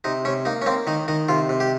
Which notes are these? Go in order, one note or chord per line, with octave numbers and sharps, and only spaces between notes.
C3 D#4
C3 C#4
A#3 D#4
C#4
A#3 C4
D#3 D#4
D#3 D#4
C3 F4
C3
G4